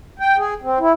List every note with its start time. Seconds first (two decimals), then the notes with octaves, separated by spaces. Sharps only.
0.20 G5
0.38 G#4
0.62 C4
0.80 E4